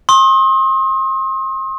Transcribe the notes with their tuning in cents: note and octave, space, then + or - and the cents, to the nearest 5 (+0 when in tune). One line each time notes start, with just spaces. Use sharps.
C6 +35 D#6 +30